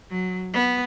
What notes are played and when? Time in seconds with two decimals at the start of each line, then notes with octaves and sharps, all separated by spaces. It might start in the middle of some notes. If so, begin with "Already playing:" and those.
0.10 F#3
0.54 B3